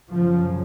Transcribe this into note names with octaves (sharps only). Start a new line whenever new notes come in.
F#2 C#3 F3